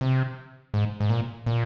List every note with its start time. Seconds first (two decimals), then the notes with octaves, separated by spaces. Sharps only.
0.01 C3
0.74 G#2
1.00 G#2
1.10 A#2
1.46 A#2